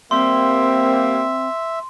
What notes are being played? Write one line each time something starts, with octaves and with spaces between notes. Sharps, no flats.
G3 A#3 C4 E5 C6